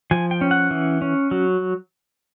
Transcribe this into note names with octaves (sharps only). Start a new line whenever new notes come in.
F3 G#5
G5
C#4
F#5
E3
C#4
F#3